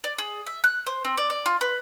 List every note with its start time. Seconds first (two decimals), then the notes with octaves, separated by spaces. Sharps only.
0.04 D5
0.18 G#4
0.46 E5
0.64 F#6
0.87 C5
1.05 C4
1.17 D5
1.30 D5
1.46 F4
1.61 B4